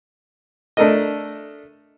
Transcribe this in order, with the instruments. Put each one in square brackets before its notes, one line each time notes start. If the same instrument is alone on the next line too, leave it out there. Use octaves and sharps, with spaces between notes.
[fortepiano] A3 D4 A4 A#4 D#5